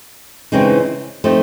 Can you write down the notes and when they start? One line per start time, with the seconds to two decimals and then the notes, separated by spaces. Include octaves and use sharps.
0.52 C#3 E3 G#3 C4 D#4
1.24 F3 A3 C4 D#4